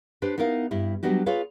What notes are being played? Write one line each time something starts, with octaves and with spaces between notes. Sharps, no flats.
D4 G4 B4 C5
B3 D#4 E4 A#4 F5
G2 G3 E4
F#3 G3 B3 D4 F#4 G4
F4 G#4 B4 C#5 F5